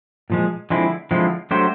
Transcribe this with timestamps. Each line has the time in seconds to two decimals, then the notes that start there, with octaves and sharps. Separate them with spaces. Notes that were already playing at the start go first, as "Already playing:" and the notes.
0.30 A#2 F3 G#3
0.70 D3 F3 G#3 C4 E4
1.11 D3 F3 G#3 C4 E4
1.51 F#3 A3 D4 G4 C5